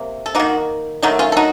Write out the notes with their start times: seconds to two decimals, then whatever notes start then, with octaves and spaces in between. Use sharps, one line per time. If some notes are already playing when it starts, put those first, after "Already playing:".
Already playing: C3 A#3
0.26 A4
0.35 D#3 A#3 D#4 F#4
1.03 D#3 F#3 A3 D#4 F#4
1.19 C#4 F4
1.32 A4
1.37 D#4 F#4